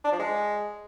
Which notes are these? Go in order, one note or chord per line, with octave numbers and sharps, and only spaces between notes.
D4
F3
G#3